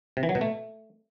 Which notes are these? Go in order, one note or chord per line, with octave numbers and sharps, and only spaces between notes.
C3
E3
F#3
B2
A3